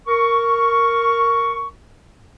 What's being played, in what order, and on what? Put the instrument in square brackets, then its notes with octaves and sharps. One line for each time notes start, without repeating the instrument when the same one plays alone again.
[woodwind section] A#4 C#6